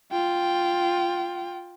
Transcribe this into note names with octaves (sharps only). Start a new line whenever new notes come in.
F4 G5